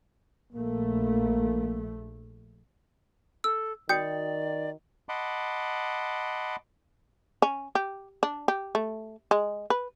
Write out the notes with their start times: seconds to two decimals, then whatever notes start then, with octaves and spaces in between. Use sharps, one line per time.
0.53 A#1 A3 A#3
3.44 A4 E6
3.89 D#3 F#4 D5 G5 D#6 G6 C#7
5.09 D#5 F#5 A5 B5 C6 D6
7.42 C#4
7.75 G4
8.23 D4
8.48 G4
8.75 A3
9.31 G#3
9.70 B4